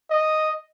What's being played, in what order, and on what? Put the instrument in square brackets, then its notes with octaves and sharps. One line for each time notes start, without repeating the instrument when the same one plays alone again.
[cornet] D#5